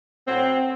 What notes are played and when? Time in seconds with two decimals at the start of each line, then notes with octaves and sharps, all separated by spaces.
0.28 A2 F#3 C4